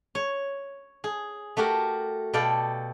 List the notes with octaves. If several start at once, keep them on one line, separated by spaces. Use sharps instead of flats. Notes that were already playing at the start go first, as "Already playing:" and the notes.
C#5
G#4
A3 F#4 G4 A#4
B2 A4 D5 F5 G5